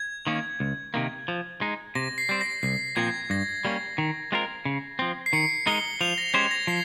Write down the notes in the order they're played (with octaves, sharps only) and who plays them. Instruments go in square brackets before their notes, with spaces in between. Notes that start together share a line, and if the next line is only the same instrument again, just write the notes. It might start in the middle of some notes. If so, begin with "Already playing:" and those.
Already playing: [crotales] G#6
[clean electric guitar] D#3 A#3 C#4
C#2
C3 D#3 A#3
F3
G#3 D#4
[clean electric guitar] C3 [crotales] A#6
[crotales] C7
[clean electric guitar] G3 C4
[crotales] A#6
[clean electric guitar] C2 [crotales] C7
[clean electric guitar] A#2 F3 C4 [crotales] G#6
[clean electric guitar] G2 [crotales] A#6
[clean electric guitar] G3 A#3 C#4
D#3
G#3 C4 F4 A#4
C#3
F3 C4
[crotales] C7
[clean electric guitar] D#3 [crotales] C#7
[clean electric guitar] G#3 D#4 A#4 [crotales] G7
[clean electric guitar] F3 [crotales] F7
[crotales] A#6
[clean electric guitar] G#3 C#4 G4 C5 [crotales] G#6
[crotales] A#6
[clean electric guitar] F3 [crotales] C7